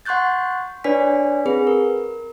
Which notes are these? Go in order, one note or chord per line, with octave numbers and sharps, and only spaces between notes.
F#5 C6 C#6 F#6 G6 A6
D4 B4 C#5 D5 G#5 B6
C4 G#4 B4
A#4